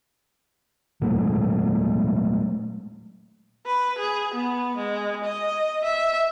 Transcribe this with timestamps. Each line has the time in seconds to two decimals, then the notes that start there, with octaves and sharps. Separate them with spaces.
1.02 A#2 F#3 G#3 A3
3.66 B4
3.98 G#4
4.34 B3
4.77 G#3
5.24 D#5
5.84 E5